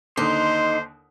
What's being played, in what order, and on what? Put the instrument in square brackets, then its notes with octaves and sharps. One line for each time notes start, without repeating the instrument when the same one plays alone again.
[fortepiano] D#2 D3 D6 [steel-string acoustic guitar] D#4 [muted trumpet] C5 [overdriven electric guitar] C6